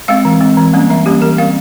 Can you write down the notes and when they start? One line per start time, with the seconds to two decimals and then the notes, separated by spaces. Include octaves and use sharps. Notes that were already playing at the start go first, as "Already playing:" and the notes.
0.08 G#3 C4 F5
0.25 E3
0.41 G#3 C4
0.57 E3
0.73 G3 A#3 C#4
0.90 E3 E5
1.06 G3 A#3 C#4 G4
1.22 E3 A#4
1.38 G3 C4 F5